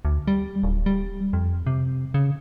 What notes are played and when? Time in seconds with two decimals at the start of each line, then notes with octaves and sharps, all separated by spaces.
0.05 D2
0.28 G3
0.63 D1
0.86 G3
1.33 F2
1.67 C3
2.14 C#3